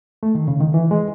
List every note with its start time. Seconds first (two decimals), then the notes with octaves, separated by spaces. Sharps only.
0.23 A3
0.35 D#3
0.48 C#3
0.60 D#3
0.74 E3
0.91 G#3